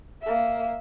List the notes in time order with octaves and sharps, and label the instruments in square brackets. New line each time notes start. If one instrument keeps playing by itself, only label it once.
[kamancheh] A#3 E5